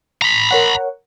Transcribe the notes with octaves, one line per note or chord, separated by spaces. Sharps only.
A#5 B5
A#4 C#5 F#5